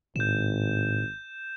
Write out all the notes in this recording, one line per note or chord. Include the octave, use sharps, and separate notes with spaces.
G#1 A2 G6 E7